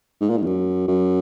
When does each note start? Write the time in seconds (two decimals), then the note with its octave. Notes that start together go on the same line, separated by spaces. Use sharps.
0.21 G#2
0.30 A#2
0.38 G#2
0.42 E2
0.47 F#2
0.88 F#2